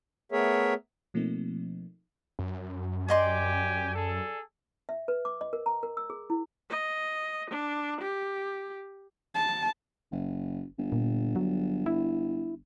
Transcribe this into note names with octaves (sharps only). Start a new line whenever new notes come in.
A3 B3 G#4 A#4 C#5 E5
B2 F3 A3 A#3 C4 D#4
F#2
G4 D5 D#5 G5 G#5 C6
G#4 A4
E5
B4
D6
D#5
A#4
A#5
A#4
E6
G#4
E4
D#5
D4
G4
A5
F#1
G1
A#2
F#3
E4